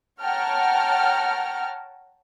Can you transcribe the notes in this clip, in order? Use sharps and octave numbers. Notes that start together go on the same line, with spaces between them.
C#5 F#5 G5 A5 A#5 F6